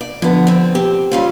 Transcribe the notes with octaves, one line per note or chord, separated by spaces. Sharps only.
D5
D3 F3 B3
D3 C4
C4 G4
G3 C#4 F4